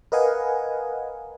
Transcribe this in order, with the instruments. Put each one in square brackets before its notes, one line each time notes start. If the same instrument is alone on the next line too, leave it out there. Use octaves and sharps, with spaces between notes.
[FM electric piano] A#4 B4 D#5 F5 F#5 G#5